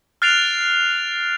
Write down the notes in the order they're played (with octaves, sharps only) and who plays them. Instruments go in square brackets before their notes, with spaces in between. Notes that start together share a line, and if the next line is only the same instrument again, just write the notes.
[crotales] F6 F#6 A6 C7 D7 F7